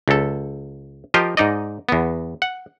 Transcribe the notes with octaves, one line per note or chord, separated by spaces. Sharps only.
C#2 A4
F3 F4 G4 A#4 D#5
G#2 D#4 D5 D#5
E2 B3
F#5